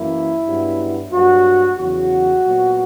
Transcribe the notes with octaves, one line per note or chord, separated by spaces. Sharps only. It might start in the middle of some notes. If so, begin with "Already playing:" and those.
Already playing: F#2 E3 A#3 E4
G2 F#3 B3
G2 F#3 A#3 F#4
E2 C#3 F#3 F#4
A#2 F#3 B3